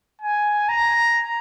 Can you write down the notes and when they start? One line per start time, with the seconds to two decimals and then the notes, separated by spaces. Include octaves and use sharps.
0.22 G#5
0.69 A#5